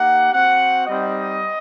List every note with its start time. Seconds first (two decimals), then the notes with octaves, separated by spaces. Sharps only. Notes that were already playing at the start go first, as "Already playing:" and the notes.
Already playing: A#3 D#4 G4 F#5
0.32 C4 F#4 F#5
0.87 G3 C4 D#4 D#5